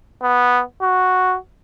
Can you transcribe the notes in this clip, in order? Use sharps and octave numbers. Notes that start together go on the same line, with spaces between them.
B3
F#4